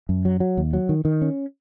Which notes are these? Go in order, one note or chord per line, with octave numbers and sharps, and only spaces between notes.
F#2
F#3
F#3
D#2
F#3
D#3
D#3
C#4